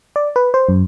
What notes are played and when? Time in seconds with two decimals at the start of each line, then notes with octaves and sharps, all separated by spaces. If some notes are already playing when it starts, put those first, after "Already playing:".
0.16 D5
0.36 B4
0.54 C5
0.69 F#2